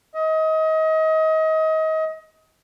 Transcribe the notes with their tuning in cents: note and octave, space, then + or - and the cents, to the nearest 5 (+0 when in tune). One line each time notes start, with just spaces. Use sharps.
D#5 +30